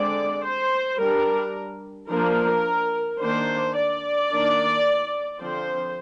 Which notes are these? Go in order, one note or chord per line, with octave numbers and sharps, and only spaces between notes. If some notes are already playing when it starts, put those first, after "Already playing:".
Already playing: D3 G#3 C4 D5
C5
G3 D4 A#4
F3 A#3 D4 A#4
D#3 A#3 D4 C5
D5
D#3 A#3 D4
D3 F3 C4 C5